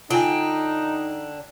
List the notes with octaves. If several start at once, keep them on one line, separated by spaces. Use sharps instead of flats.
D3 D4 D#4 F4 G5 G#5